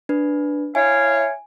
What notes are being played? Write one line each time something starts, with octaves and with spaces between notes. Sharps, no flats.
D4 B4
E4 C#5 F5 G#5